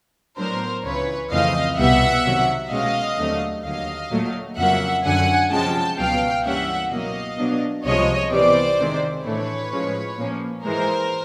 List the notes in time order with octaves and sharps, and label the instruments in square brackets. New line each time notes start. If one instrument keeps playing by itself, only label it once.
[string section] A2 F#3 B3 D4 A#4 C5
C#2 C#3 E3 B4 C#5
F2 C#3 E3 A3 C4 D#5 F5
C2 B2 G3 B3 E5 F#5
C3 D#3 F#3
B2 G#3 C#4 D#5 F5
D#2 D3 F#3 A3 C4
D#2 D3 F#3 D#5 F5
A#2 F#3 A3
F2 C#3 F#3 A#3 E5 F#5
F#2 D3 F#3 F#5 G#5
C3 F3 G#3 C#4 G5 A5
C#2 B2 F#3 B3 F5 G5
G2 E3 G3 A#3 C#4 E5 F#5
B2 F#3 A#3 D#5 F5
B2 F#3 B3 D4
C2 C3 F3 G#3 C#5 D#5
C3 E3 G3 B3 C5 D5
C3 D#3 G#3 C4
A2 E3 A3 D4 B4 C#5
A2 F3 G#3 C#4
A#2 F3 A#3 C#4
G#2 E3 G#3 A#4 C5